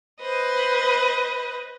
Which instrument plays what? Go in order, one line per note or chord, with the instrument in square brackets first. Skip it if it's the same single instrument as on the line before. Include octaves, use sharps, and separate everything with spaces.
[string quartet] B4 C5 D#5